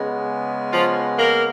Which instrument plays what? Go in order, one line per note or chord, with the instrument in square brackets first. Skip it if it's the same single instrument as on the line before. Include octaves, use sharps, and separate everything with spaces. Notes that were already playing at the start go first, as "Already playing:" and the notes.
Already playing: [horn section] C#3 G#3 B3
F3 F4
A#3 A#4